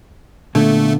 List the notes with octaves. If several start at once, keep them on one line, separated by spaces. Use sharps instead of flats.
A#2 D3 A3 B3